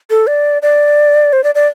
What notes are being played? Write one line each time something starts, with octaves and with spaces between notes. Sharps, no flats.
A4
D5
D5
C5
D5
D5